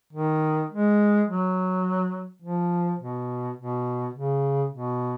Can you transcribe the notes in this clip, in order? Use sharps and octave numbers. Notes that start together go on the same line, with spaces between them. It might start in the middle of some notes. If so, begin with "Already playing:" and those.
D#3
G#3
F#3
F3
B2
B2
C#3
B2